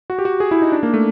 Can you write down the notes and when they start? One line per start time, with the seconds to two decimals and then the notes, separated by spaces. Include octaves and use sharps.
0.10 F#4
0.19 G4
0.25 F#4
0.40 G#4
0.51 E4
0.62 D#4
0.72 D4
0.83 A#3
0.94 A3